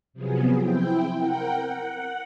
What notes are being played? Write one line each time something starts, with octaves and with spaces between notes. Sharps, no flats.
C3 F3 F#3 B3 G#4
C4 E4 G5
A#4 F#5 G5
F#5